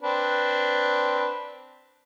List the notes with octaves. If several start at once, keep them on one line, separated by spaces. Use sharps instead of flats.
C4 D4 B4